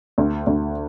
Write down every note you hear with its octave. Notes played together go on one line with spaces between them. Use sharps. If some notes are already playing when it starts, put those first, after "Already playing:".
D2
D2